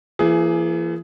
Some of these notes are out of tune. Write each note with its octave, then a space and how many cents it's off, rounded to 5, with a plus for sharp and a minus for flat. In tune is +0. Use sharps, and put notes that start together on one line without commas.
E3 +40 A#3 +0 G#4 +15